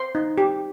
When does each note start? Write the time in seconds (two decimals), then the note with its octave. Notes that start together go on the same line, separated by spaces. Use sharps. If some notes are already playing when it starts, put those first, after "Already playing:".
Already playing: C5 C6
0.15 D#4
0.38 G4